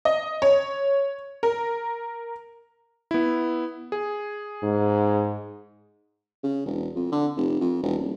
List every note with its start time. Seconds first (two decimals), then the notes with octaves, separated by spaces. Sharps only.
0.05 D#5
0.42 C#5
1.43 A#4
3.11 B3 E4
3.92 G#4
4.63 G#2
6.43 C#3
6.66 E1
6.95 F2
7.12 D3
7.36 F1
7.61 F2
7.83 E1
7.97 D#1